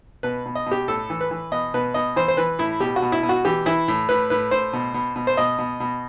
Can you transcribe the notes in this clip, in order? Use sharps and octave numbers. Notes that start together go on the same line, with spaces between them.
B2 B4
B2
D#5
B2
G4
A2 A4
E3
B4
E3
B2 D#5
B2 B4
B2 D#5
E3 C5
C5
E3 B4
A2 E4
B2 G4
F#4
B2
E4
B2
F#4
E3 G4
E3 E4
A2
A2 B4
A2 B4
A2 C5
B2
B2
B2
C5
B2 D#5
B2
B2